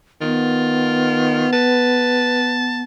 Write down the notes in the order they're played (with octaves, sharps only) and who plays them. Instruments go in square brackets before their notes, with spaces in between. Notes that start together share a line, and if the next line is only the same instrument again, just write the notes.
[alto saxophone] D#3 [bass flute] B3 [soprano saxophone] F4
[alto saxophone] B4 [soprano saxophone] A5